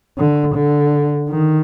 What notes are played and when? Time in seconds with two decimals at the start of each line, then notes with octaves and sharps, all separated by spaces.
0.18 D3
0.55 D3
1.29 D#3